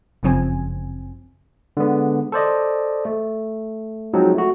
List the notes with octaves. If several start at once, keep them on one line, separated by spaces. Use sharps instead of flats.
G1 F#2 C#3 F3 C4 G#5
D3 G#3 B3
A4 C5 D5 D#5
A3
F3 F#3 G#3 C4 D#4
A3 F#4